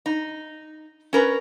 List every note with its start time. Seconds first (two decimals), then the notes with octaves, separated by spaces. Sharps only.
0.06 D#4
1.13 C#4 A#4 B4